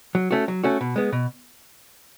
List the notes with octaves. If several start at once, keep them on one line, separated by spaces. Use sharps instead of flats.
F#3
A3 C#4 F#4
F#3
A3 C#4 F#4
B2
G#3 B3
B2